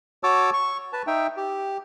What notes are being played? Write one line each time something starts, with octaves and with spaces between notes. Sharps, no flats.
F#4 C#5 A5 D6 E6
C#6
B4 A5
D#4 E5 G5
G4